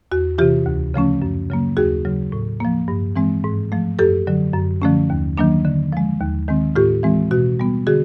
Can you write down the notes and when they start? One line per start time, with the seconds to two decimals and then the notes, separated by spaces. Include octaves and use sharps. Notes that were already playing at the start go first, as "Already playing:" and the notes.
0.12 E2 F#4
0.38 C3 E3 F4 G4
0.66 D2
0.94 C#3 F3 A3 C#4
1.22 F#2
1.50 C#3 F#3 A#3
1.77 D#2 F#4 G#4
2.05 C#3 F#3
2.32 A2
2.60 F3 A#3
2.88 G2
3.16 E3 G#3 C4
3.44 G#2
3.72 F3 A3
3.99 F#2 G4 A4
4.27 D3 F#3
4.54 F#2
4.82 D3 F3 A3 C#4
5.10 D#2
5.38 D#3 F#3 A#3 D4
5.65 D3
5.93 F3 G#3
6.21 D#2
6.48 D#3 G#3 C4
6.76 A2 F4 G4
7.03 E3 G#3 C4
7.31 B2 F#4
7.60 G3 B3
7.87 D3 F#4 G#4